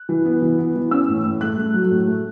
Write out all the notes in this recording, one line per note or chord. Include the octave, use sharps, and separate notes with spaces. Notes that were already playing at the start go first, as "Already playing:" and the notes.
Already playing: F#6
E3
B3
E3
B3
E3
C#4 E6
A2
A2
A3 F#6
A3
F#3
A2
A3